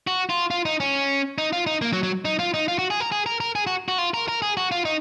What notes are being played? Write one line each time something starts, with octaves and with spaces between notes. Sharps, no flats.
F#4
F4
F4
D#4
C#4
D#4
F4
D#4
A#3
F#3
F#3
D#4
F4
D#4
F4
F#4
G#4
A#4
G#4
A#4
A#4
G#4
F#4
F#4
F4
A#4
A#4
G#4
F#4
F4
D#4